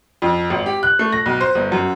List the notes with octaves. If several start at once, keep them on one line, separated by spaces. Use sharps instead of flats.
F2
G#1
G4
F#6
A3
A#6
B1
C5
G1
F#2